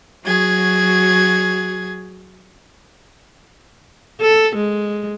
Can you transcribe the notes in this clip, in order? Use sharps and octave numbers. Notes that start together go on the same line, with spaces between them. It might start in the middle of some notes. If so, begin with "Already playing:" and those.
F#3 F#4 G#4 G#6
A4
G#3